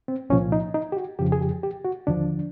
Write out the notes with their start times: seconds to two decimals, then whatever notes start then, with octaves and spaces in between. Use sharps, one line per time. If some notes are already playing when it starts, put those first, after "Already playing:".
0.08 C4
0.30 C2 A#2 F3 C#4
0.52 D#4
0.74 D#4
0.92 G4
0.97 F#4
1.19 F2 C#3 F3 G4
1.32 G#4
1.41 G4
1.63 G4
1.85 F#4
2.07 D#2 D3 F3 D4